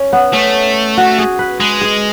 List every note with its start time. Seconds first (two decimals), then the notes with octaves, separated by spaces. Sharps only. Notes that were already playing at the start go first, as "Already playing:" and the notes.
Already playing: C#4
0.13 B3
0.33 A3 C#4
0.98 F#4
1.18 G#4
1.39 B4
1.60 G#3 B4
1.81 G#4